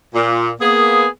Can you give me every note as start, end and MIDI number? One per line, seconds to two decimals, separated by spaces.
0.14 0.50 46
0.61 1.06 58
0.61 1.06 59
0.61 1.06 68